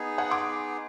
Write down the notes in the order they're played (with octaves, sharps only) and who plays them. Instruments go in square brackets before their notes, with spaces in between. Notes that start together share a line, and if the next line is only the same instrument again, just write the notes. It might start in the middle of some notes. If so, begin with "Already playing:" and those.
Already playing: [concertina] B3 D#4 G#4
[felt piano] F#5 G#5
C6 D6